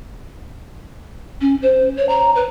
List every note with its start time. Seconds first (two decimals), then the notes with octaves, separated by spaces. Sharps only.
1.41 C#4
1.62 C5
1.97 C#5
2.09 A#5
2.35 B4